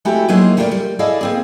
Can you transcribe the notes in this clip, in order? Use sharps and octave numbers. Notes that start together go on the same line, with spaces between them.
G#3 A3 C4 E4 F#4 G4
F#3 G#3 A#3 D#4 E4 C5
G3 A3 A#3 F4 A#4 D5
G3
E4 G#4 A4 D5 D#5 F5
A#3 C4 G#4